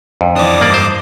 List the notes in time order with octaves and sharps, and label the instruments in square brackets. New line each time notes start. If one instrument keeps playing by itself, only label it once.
[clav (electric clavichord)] F2
[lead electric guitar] E3 D4 [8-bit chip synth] D6 D#6
[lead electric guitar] G2 [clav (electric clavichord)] A#3 D5
[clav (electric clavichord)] C5